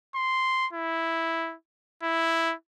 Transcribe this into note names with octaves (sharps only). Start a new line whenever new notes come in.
C6
E4
E4